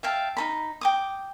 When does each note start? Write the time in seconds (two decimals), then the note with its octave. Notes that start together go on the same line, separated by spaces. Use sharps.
0.03 E5 F5 G5 A5
0.37 D#4 A4 B5
0.81 G5 D6 D#6